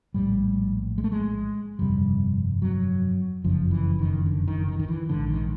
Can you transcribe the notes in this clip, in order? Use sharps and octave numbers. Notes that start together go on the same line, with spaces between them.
A#1 A2 G3
G#3
A3
G#3
G1 F2 C3 G3
F#3
F#1 F2 C#3 F3
E3
D#3
D3
D#3
D#3
D#3
E3
A#1 G#2 D3
D#3